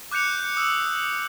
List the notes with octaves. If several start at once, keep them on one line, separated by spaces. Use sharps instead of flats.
D6 F#6 G6 C#7 F7
D#6 E6